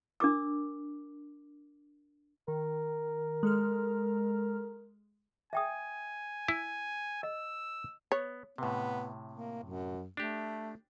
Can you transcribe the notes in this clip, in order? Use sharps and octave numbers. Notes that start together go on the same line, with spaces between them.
D4 A#4 D6 E6
D#3 A#4
G#3 A4 F6
E5 G5 G#5 D#6
E4
D#5 E6
B3 C#5
A2 C3 B3
A#3
F#2
A3 D4 G4